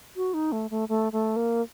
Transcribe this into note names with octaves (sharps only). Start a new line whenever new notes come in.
F#4
D#4
A3
A3
A3
A3
A#3